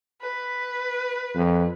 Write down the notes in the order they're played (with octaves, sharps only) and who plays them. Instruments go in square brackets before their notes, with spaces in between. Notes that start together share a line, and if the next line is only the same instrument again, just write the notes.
[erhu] B4
[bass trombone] F2